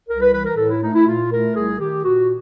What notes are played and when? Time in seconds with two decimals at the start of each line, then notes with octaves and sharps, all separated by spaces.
0.09 C2 A#4
0.21 B4
0.33 E3 B4
0.45 A#4
0.57 A2 A4
0.69 E4
0.81 A3 D#4
0.94 E4
1.06 A#2 F4
1.30 A3 A#4
1.55 C2 G#4
1.79 D#3 G4
2.04 A#2 F#4